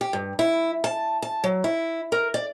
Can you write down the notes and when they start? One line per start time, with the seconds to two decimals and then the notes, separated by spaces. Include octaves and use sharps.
0.01 G4
0.13 G2
0.39 E4
0.84 A5
1.22 A5
1.44 F#3
1.64 E4
2.12 A#4
2.34 D5